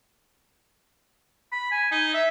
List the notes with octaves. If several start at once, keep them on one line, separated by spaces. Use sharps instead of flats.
B5
G#5
D#4
E5